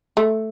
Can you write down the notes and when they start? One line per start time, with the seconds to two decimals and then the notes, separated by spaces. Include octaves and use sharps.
0.17 A3